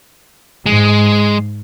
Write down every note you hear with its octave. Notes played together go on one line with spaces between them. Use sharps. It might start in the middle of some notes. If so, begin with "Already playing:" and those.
G#2 G#3